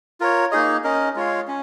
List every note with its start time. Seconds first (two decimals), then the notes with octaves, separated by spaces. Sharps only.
0.20 F4 A#4 C#5
0.52 A#3 D#4 G#4 D#5
0.84 C#4 A#4 D#5
1.16 G#3 F4 C#5 F5
1.48 C#4